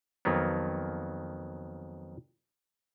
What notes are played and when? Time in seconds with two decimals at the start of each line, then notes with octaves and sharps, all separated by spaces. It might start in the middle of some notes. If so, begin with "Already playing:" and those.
0.25 F2 D#3 F#3 A#3 B3